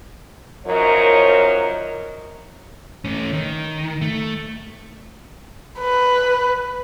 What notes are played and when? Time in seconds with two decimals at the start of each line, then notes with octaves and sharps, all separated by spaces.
0.66 F#2 F3 D#4 A#4 C#5
3.05 A3 C#4
3.33 D#3
4.01 A3
5.79 B4